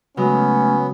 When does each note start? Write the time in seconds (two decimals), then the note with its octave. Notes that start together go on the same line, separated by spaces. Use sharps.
0.17 C#3 F#3 G#3 A3 B3 C#4